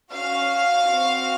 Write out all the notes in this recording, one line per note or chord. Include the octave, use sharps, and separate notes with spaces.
C#4 F#4 F5
C4 F#4